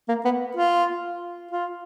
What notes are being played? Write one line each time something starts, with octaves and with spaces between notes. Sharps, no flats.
A#3
B3
F4
F4